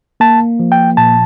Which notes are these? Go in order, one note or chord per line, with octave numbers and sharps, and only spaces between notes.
A#3 A5
F3
G5
A#2 A5